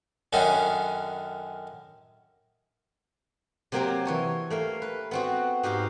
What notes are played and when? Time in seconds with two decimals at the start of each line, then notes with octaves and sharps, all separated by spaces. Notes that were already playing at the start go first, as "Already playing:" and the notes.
0.33 F#2 D3 D#3 C#4
3.72 C3 F#3 A#3 C4 G4 A#4
4.05 E3 C#5 A5
4.50 A3 A#3 F5
4.82 B4
5.11 B3 C4 F#4
5.63 G#2 F#4 G4 F5